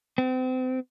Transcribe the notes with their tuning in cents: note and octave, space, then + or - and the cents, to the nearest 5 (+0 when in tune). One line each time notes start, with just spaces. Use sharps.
C4 -35